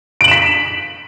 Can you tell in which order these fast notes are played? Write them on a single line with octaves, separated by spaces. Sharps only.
D7 F#7 E7 B6